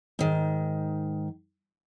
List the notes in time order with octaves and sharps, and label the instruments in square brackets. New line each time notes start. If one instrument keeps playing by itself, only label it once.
[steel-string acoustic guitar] G#2 D#3